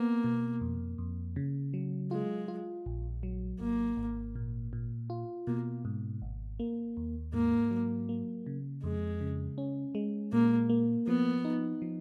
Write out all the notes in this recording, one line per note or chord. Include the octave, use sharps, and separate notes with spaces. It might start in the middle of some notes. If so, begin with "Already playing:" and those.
Already playing: A#3 B3
B2
F2
F2
C#3
F#3
G#3 F4
F4
A#1
F#3
G#1 A#3
G#1
A#2
A#2
F4
B2 A#3
G#2
G#1
A#3
D#2
G#2 A#3
F#3
A#3
C#3
F2 G#3
C#3
C#4
G#3
A#2 A#3
A#3
F3 B3
D#4
F3